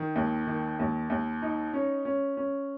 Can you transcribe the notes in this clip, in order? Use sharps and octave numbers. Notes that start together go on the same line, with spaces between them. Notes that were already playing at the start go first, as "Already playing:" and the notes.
Already playing: D#3
D#2
D#3
D#2
D#2
D#4
C#4
C#4
C#4